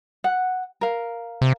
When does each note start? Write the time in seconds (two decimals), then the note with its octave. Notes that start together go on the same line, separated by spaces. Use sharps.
0.24 F#5
0.81 A#4 F5
1.41 C3